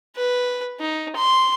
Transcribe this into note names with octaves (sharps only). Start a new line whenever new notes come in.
B4
D#4
C6